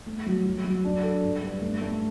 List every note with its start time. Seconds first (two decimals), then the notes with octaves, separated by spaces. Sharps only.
0.06 A3
0.26 F#3
0.46 F#3
0.64 F#3
0.85 D4
1.03 A4
1.23 G2
1.43 G2
1.61 A3
1.81 A3